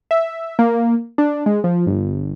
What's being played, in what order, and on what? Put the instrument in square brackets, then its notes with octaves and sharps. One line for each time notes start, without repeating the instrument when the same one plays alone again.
[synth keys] E5
A#3
D4
G#3
F3
G1